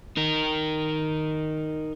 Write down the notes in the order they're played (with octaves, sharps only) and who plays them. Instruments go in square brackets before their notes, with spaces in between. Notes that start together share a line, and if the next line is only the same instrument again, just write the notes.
[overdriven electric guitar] D#4 A#4